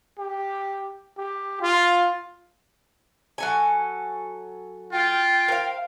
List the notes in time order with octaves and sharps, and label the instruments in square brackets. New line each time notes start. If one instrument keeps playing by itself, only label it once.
[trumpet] G4
G4
F4
[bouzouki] F#3 A4 G#5
[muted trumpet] F4 [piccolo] G5
[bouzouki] A#4 C5 F5